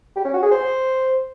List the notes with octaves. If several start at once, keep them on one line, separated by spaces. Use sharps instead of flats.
G4
C#4
F#4
G#4
C5